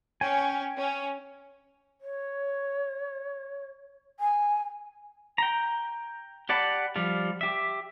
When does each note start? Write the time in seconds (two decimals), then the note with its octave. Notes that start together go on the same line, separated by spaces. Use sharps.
0.21 C#4 G5 G#5
0.77 C#4
2.01 C#5
4.20 G#5
5.38 G5 A#5
6.49 G4 D5 F#5 A5 B5
6.96 F3 G3 F4
7.41 G4 E5